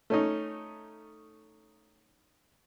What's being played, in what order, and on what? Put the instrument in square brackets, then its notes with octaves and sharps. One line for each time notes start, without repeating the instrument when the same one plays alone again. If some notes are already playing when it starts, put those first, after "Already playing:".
[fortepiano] A3 C#4 D#4